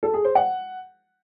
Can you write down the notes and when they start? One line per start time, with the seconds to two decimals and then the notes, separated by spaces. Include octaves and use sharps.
0.03 A4
0.14 G#4
0.24 C5
0.35 F#5